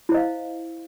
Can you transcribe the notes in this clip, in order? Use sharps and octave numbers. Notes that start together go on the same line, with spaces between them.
E4 C5 D#5 F5